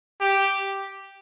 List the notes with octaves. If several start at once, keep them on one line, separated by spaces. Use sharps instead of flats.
G4